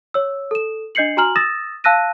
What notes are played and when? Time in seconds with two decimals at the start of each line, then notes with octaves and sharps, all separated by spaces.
0.14 C#5 E6
0.51 A4 E7
0.95 D4 D#5 G6 C7 C#7 F#7
1.17 F#4 G#5 A#5 F6 F#7
1.36 D#6 E6 A6 A#6 E7
1.84 F5 A5 E6 F#6 A#6 D#7